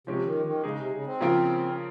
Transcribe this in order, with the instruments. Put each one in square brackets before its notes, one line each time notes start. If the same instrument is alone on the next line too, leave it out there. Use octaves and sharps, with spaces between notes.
[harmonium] C3 [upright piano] F3 G#3 C#4 G4
[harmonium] D#3
D#3
[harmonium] C#3 [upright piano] G#3 D#4 G#4
[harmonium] C3
C#3
C4
[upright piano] C#3 F3 A#3 F4 A#4